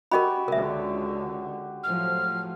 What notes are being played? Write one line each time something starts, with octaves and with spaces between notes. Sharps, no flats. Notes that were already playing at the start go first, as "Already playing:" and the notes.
F#4 G4 A#4 D#5 B5 C#6
C#2 D3 A#4 E5
A2 F3 F#3 F6